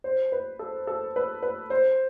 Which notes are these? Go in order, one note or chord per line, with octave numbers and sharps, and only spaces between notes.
C5
B4
A4
A4
B4
B4
C5